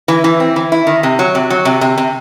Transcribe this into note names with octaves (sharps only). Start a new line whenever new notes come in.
E3
E3
C4
E3
E4
D#3
C3
F#3
C3
F#3
C3
C3
C3